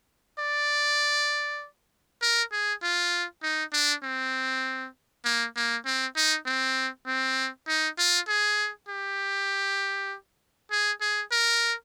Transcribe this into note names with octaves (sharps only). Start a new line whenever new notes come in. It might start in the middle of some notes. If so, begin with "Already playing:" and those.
D5
A#4
G#4
F4
D#4
D4
C4
A#3
A#3
C4
D#4
C4
C4
D#4
F4
G#4
G4
G#4
G#4
A#4